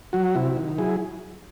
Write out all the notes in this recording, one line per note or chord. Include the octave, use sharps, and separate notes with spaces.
F#3 F#4
C3 E4
D#3
F#3 E4 G#4